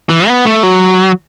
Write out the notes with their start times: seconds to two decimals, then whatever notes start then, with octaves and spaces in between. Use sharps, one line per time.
0.09 E3
0.28 B3
0.46 A3
0.63 F#3